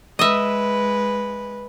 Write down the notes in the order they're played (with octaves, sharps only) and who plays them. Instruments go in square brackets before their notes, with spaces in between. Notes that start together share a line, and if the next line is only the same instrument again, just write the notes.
[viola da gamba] G#3 B4 [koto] D#5 E5